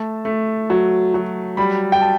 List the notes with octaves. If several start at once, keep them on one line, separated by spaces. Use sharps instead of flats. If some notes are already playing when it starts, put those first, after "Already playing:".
Already playing: A3 A5
A3
F#3
F#3
G3 B5
G5
A5